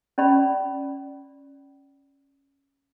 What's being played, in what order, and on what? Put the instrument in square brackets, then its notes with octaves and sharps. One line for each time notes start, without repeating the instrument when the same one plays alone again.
[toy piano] C#4 D5 B5